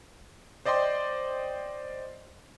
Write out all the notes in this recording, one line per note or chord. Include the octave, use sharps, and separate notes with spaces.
C5 D5 D#5 G5 C6